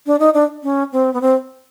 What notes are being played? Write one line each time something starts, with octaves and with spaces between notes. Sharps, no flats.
D4
D#4
D4
C#4
C4
B3
C4